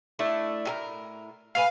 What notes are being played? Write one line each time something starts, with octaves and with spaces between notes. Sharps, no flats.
A3 D4 E4
A2 G#4 A#4
A2 B4 F5 G#5